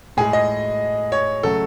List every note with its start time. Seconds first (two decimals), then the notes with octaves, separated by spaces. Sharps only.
0.17 A2 G#3 G#4
0.33 D#5
1.12 C#5
1.43 C#3 F#3 A3 A4